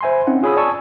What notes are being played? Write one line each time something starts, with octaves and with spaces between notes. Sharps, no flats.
C5 E5 G#5 B5 C6
C4 C#4 D#4 F#5
F4 G#4 C#5 B5 D#6 E6
D5 G#5 A5 C#6 E6